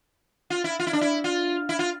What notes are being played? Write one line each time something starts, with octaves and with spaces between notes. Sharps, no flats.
F4
E4
F4
E4
D4
E4
F4
E4
F4